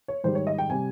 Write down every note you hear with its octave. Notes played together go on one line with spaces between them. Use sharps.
C#5
G#2 D#3 G3 C5
C#5
D#5
G5
C3 G3 G#5